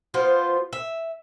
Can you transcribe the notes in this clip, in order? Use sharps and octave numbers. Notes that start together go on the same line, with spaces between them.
F3 B3 F4 C5
E5